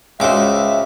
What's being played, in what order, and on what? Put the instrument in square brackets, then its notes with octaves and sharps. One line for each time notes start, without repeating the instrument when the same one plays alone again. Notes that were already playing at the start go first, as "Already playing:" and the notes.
[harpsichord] C#2 D6 [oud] G#3 F#4 C5 [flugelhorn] E5